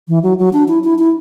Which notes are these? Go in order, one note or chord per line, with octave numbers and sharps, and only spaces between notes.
E3
F#3
F#3
D4
E4
E4
E4